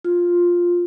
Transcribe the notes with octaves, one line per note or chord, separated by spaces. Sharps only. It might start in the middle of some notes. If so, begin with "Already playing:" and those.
F4